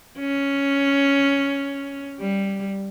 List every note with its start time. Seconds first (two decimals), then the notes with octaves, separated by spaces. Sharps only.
0.19 C#4
2.20 G3